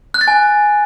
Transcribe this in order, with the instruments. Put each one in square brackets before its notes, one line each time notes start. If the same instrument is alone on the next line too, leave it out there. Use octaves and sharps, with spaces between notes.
[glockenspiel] F#6
A6
G#5